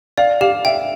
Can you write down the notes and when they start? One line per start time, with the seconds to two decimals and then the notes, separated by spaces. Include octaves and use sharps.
0.17 D5 F5
0.41 G4 F5
0.65 E5 G5